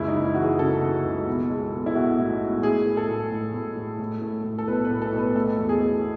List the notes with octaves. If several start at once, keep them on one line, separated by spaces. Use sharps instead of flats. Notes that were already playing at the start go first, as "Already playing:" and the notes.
Already playing: F#1 C#2 E4
D#4
C#2
E4
E3 F#4
G#4
C#3 A4
C#3
C#2
B1
G#3
B1
E4
B1 F#4
A2
G#3
A2 G#4
A3
A4
A2
A2
A2
A2
A2
A3
A2
A4
B1 B4
B4
A2
A4
B1
B4
A3 A4
E2
G#4
A3